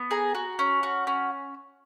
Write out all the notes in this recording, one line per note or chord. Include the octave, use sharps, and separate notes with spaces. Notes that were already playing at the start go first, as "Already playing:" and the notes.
Already playing: B3
G#4 A#5
F#4
C#4
F#4
C#4